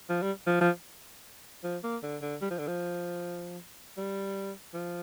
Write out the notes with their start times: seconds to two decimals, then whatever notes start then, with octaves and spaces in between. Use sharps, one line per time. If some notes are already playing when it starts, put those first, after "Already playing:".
0.09 F3
0.22 G3
0.47 F3
0.61 F3
1.64 F3
1.83 A#3
2.03 D3
2.22 D3
2.41 G3
2.51 F3
2.58 D3
2.68 F3
3.97 G3
4.74 F3